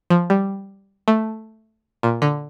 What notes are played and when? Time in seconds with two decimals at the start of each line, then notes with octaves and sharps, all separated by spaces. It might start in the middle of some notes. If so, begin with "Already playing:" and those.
0.10 F3
0.30 G3
1.08 A3
2.03 A#2
2.22 D3